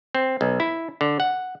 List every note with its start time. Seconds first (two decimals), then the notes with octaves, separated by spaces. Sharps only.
0.15 C4
0.41 B1
0.60 E4
1.01 D3
1.20 F#5